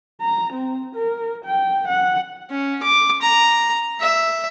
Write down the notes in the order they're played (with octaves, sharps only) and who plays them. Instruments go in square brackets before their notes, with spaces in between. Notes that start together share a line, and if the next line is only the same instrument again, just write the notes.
[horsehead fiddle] A#5
C4
A#4
G5
F#5
[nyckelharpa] C#4
D6
A#5
E5